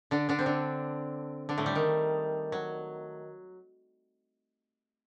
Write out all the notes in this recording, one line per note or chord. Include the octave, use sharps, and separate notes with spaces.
D3 D4
D3 D4
C4
D3 D4
D3 D4
A2 A3
G3
D#3
F#3